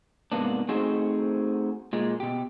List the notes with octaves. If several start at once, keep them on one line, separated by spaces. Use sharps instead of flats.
G#2 C3 A#3 B3 D4
A3 C4 D#4 F#4 G#4 C5
A#2 G#3
B2 G4